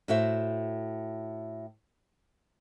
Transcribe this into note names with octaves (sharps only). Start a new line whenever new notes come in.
A2 F#4 C5 E5